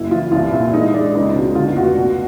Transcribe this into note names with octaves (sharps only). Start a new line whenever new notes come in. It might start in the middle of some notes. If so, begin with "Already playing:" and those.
Already playing: F#1 F#3 E4
E3 F4
C2 F4
A#2 E4
G#3 D#4
G#3 D4
C#2 D#4
B2
D3 F4
F1 F#4
B2